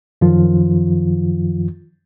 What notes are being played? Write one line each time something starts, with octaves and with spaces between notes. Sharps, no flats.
F#2 D#3 F3 F4